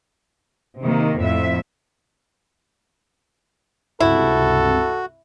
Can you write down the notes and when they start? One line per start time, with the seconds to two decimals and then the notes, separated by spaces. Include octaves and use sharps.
0.80 C3 D#3 A#3
1.17 F2 A2 E5
4.00 C#2 G2 C3 E4 F#4 A4